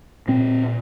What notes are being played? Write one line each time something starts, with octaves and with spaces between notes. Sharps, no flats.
A#2 C4